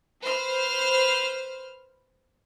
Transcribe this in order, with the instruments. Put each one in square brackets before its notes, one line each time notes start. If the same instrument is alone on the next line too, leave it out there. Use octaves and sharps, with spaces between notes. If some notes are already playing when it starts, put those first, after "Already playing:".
[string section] B4 C5 F6